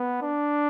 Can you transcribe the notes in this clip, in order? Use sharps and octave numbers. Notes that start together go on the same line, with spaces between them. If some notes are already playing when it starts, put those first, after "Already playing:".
Already playing: B3
D4